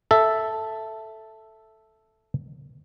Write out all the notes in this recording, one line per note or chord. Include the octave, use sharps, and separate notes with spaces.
A4 E5